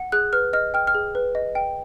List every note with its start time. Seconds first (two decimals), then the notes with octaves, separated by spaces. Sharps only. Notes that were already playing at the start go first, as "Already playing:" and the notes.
Already playing: F#5
0.12 G#4 F#6
0.33 B4 F6
0.53 D#5 F6
0.74 G5 F6
0.87 F6
0.95 G#4
1.15 B4
1.35 D#5
1.55 G5